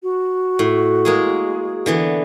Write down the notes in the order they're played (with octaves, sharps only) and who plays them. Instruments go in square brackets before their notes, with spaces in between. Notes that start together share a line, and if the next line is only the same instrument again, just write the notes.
[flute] F#4
[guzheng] A2
G#3 A#3 G#4
D3 E3 B3